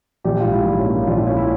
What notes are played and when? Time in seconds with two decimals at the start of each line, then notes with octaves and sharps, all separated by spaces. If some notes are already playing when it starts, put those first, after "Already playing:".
0.24 A#1 G4
0.40 G#2 F4
0.52 E4
0.66 A#1
0.79 C#4
0.86 A#3
1.07 A#1 F4
1.17 E4
1.27 A#3 C#4
1.37 E4